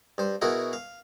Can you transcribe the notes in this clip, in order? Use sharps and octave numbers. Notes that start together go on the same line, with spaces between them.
G2 C5
B2 E4 F#4 G#4 A#4
F5